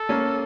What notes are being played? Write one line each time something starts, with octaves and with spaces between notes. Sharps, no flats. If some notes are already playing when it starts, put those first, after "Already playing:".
Already playing: A4
A#3 C#4